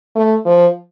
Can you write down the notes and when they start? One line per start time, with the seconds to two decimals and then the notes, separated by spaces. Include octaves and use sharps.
0.16 A3
0.45 F3